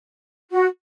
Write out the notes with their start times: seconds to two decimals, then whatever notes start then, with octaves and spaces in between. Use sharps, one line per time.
0.51 F#4